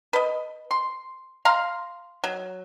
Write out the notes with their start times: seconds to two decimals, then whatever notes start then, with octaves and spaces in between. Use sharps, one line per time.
0.13 B4 D#5
0.71 C6
1.45 F5 A#5 C6
2.24 F#3